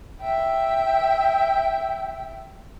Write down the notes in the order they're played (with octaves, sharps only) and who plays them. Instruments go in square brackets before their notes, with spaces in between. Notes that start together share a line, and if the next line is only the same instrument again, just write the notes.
[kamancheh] E5 G5